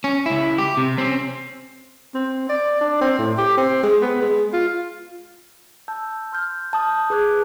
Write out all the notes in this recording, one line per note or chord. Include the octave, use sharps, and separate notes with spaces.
C#4
C#2 E4
G4
C3
C4 C#4
C4
D5
D4
C4
A2
G4
C4
G#3
B3
G#3
F4
A5 E6 G6
C6 F6 G6
A5 D#6 G6
G#4 B4 A5 D6 F#6 G#6